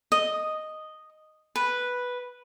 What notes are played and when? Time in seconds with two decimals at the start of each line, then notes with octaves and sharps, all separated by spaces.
0.12 D#5
1.56 B4